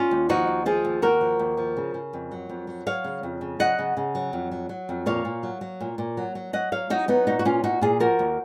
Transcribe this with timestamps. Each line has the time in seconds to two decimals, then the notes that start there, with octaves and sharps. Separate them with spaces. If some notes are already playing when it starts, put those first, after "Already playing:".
Already playing: C#4 F4
0.11 D#2
0.29 F3 D#4 F#4
0.47 D#2
0.66 F3 F4 G#4
0.85 D#2
1.02 D#2 F#4 A#4
1.21 F3
1.39 D#2
1.57 F3
1.77 C#3
1.94 C#3
2.13 F2
2.32 F#3
2.49 F2
2.67 F#3
2.86 F#3 C#5 F5
3.04 C#3
3.23 F2
3.41 C#3
3.59 F#3 D#5 F#5
3.79 C#3
3.97 C#3
4.15 F#3
4.33 F2
4.52 F#3
4.69 F#3
4.89 F2
5.06 A#2 C#5 F5
5.25 A#2
5.43 F#3
5.61 F#3
5.80 A#2
5.98 A#2
6.17 F#3
6.35 F#3
6.53 F#3 D#5 F#5
6.72 F#3 C#5 F5
6.90 F#3 D#4 F#4
7.08 F#3 B3 D#4
7.27 A#2 D#4 F#4
7.39 F#4
7.45 A#2 C#4 F4
7.63 A#2 D#4 F#4
7.81 A#2 F4 G#4
8.00 F3 F#4 A#4
8.19 D#2